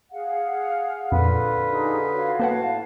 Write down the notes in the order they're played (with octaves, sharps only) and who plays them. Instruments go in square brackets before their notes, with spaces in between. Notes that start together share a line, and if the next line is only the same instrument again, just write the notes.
[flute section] G#4 F5 F#5
[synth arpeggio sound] F2 A#2 [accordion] D3 F4 B4
[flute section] D#4 G4 G#4
F#4 C#5 F5
[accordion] A2 A5 [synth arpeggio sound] A#3 B4 F#5